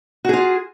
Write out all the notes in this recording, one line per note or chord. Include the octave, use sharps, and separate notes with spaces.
F4 F#4 G#4